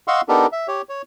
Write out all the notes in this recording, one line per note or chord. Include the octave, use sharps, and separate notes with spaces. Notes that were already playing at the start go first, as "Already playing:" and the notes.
D#5 F5 F#5 C6 C#6 E6
B3 D4 D#4 G4 A4 A#4
E5
G4 C#5
C#5